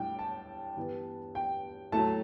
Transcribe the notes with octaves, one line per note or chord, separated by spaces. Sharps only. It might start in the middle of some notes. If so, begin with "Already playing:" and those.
Already playing: A2 G3 D4 G5
A5
G2 E3 B3
G5
A2 F#3 A3 E4 A5